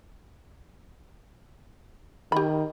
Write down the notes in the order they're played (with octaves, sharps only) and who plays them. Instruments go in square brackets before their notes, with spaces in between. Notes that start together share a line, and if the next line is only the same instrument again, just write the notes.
[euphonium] D#3 [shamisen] G4 B5